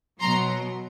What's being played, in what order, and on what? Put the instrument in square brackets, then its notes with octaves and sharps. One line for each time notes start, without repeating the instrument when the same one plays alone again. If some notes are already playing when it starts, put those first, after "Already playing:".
[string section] B2 F#3 A#5 C6